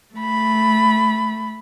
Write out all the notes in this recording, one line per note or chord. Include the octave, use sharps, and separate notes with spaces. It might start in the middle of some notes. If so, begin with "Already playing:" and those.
A3 B5